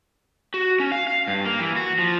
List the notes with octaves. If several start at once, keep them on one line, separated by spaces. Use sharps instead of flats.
F#4
C#4
F5
F5
G2
A#3
E3
F#4
F3